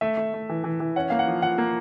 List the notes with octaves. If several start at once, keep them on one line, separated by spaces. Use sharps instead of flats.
A3 E5
A3
A3
E3
E3
E3
C#4 F#5
A#3 F5
F#5
F3
F3 F#5
A#3